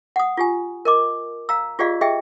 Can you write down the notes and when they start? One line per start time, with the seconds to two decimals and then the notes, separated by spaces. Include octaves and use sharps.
0.16 F#5 D#6
0.37 F4 G4 G#5
0.85 A#4 D#5 D6
1.49 F5 A#5 E6
1.79 F4 G4 G#4 D5 D#5 F5
2.01 G4 G#4 D#5 E5 G5